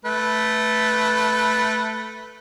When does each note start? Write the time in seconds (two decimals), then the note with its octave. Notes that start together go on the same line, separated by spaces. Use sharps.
0.05 A3 B4